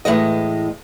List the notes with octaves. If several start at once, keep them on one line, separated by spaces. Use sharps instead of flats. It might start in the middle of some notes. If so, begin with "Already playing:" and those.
A2 E3 G#3 D#5